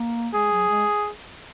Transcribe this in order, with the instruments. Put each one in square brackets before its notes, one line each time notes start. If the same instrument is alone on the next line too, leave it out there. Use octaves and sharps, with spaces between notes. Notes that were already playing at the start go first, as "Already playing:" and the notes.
Already playing: [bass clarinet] A#3
[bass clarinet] G#3 [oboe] G#4
[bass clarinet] F#3
G#3